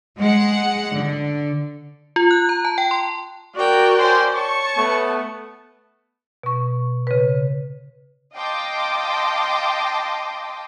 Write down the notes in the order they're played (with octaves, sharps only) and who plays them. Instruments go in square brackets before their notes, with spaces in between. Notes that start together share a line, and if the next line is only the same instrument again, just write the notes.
[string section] G#3 F#5
D3
[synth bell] F4
F#6
A#5
A5
G5
C6
[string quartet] F#4 A#4 G5 [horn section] D5
[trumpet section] C#4 C5
[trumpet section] C#5 C#6 [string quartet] A5
[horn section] A3 B3
[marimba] B2 C#6
C#3 B4
[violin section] D#5 F5 G5 A5 C6 D6